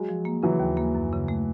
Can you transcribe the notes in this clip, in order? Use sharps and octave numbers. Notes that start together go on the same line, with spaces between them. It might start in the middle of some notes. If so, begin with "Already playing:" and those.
Already playing: F#3 G#3
F3
A#3
C#3 E3 F#3
D#2
A#3
F#2
C#3
A3